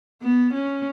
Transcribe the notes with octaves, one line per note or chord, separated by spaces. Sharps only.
B3
C#4